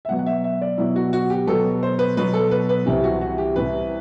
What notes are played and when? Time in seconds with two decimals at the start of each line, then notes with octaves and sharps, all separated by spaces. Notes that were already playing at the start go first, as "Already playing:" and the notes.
0.05 E5
0.08 B2 F#3 B3 F#5
0.19 F#5
0.26 E5
0.44 E5
0.61 D5
0.78 B2 F#3 B3 E4
0.96 F#4
1.13 F#4
1.30 G4
1.47 B2 F#3 B3 A4
1.83 C5
1.99 B4
2.17 B2 F#3 B3 B4
2.34 A4
2.51 B4
2.69 B4
2.85 C2 C3 E3 G4
3.04 F#4
3.21 F#4
3.38 G4
3.55 C2 C3 E3 B4